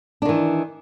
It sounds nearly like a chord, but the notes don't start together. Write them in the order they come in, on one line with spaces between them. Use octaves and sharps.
D4 D#3 E3